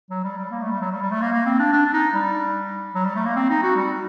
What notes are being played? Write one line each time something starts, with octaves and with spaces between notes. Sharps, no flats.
F#3
G3
G3
A#3
A3
G3
F#3
G3
G3
A3
A#3
A#3
C4
D4
D4
D4
D#4
G3
F#3
G3
A3
A#3
C4
D#4
F#4
G3